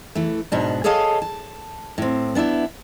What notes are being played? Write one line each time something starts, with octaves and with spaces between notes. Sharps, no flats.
E3 A3
G#2 B2 D4
G#4 A4 C#5 D#5 F5 A5
A5
A2 C4
B3 D4 E4 E5